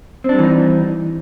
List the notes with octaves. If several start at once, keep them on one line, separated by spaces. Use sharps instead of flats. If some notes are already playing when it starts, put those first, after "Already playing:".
E3 G3 C4 D4 D#4